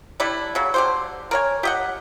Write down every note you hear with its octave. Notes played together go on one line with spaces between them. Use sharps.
G3 A3 D4 E4
C#3 F#3
D3 G4 C5
A#4 C#5 G#5
G4 D#5 F#5